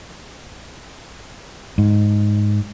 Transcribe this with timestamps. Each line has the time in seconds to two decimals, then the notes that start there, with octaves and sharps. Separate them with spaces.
1.78 G#2